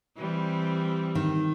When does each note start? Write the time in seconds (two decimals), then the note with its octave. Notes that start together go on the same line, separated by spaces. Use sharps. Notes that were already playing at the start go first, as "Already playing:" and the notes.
0.17 E3 G3 C4
1.15 D#3